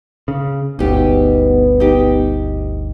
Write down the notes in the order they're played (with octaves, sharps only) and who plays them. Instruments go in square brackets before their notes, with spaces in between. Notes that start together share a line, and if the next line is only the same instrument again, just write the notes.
[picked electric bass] C#3
[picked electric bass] G1 D2 [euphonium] B3 [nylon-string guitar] D#4 G4
[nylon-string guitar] D#4 G4